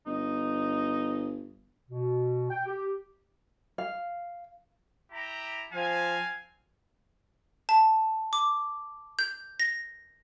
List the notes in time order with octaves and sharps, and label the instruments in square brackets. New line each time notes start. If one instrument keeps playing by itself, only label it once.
[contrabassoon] G1 [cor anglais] D#4
[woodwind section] B2
G5
G4
[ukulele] F5
[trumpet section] E4 G4 A#5
[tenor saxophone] F3 [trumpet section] C4 F5 G#5
[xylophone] A5
D6
G6
A#6